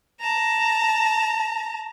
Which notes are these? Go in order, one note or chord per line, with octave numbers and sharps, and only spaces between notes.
A5 A#5